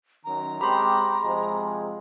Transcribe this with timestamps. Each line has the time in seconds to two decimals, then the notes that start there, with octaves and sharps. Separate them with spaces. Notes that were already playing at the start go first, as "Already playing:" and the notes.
0.25 F#2 D#3 A#5
0.61 G#3 C4 G4 B5 C6
1.22 C3 F3 G#3